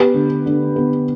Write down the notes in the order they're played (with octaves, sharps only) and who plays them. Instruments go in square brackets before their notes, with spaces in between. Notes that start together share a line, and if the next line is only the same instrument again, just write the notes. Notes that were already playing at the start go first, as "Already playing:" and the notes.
Already playing: [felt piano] B3 G4 B4
D3
D3
B3